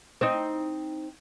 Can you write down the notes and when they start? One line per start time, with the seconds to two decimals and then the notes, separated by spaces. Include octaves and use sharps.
0.21 C4 D#4